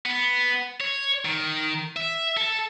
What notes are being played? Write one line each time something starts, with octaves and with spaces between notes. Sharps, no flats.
B3
C#5
D#3
E5
A4